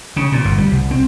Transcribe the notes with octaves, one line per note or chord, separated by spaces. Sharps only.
C#3
A#2
G1
G3
C2
C4